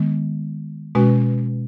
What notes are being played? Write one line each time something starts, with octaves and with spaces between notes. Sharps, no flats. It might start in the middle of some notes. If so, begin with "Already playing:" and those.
Already playing: D#3 G#3 B3
B2 G#3 C#4 F#4 B4